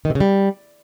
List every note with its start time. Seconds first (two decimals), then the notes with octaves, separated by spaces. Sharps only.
0.05 D#3
0.10 C3
0.15 C#3
0.21 G3